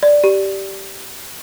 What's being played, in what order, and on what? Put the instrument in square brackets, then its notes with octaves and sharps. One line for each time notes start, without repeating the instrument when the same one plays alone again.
[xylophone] D5
G4